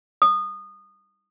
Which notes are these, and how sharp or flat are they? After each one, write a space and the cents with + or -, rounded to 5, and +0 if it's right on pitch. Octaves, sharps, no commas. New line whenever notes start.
D#6 -20